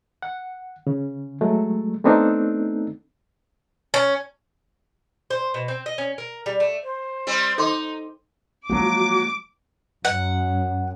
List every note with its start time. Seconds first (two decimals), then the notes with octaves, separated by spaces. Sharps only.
0.22 F#5
0.87 C#3
1.41 F#3 G#3 A3
2.04 A3 B3 C4 D4 D#4 A4
3.94 C#4
5.30 C5
5.54 B2
5.68 C4
5.86 D#5
5.98 C#4
6.18 A#4
6.46 G3
6.60 A3
6.82 C5
7.27 G3 C4
7.58 D#4 A4 C6 D6
8.70 F3 F#3 G#3 A#3 F#4 D6
10.05 F#2 F#5